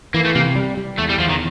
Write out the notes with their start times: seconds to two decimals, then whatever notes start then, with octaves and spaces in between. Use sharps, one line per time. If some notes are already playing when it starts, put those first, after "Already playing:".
0.14 E3 A#3
0.25 A3
0.35 C3 A#3
0.56 G3
0.77 G3
0.98 E2 A3
1.09 G3
1.19 E2 F3
1.29 D#3